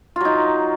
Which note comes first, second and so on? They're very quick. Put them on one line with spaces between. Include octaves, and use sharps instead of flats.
F4 F#3 D#4